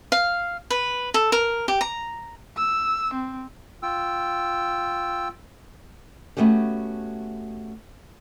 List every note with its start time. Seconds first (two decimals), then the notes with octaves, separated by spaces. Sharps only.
0.12 F5
0.71 B4
1.14 A4
1.32 A#4
1.68 G4
1.81 A#5
2.57 E6
3.14 C4
3.83 F4 G5 E6
6.37 A3 B3 C#4 F#4 G4